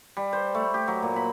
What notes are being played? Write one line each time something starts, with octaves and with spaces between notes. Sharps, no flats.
G3
C5
A3
G4
F#3
A#2
B5